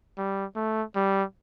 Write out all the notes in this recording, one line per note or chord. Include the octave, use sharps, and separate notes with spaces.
G3
A3
G3